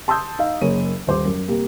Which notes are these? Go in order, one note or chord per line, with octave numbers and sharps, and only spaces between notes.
A5 C6 D#6 E6 G6
D#4 F5
F#1 A#3 G#4 C#5 D#7
D#1 C5 D6
F#2
C3 G3 A#3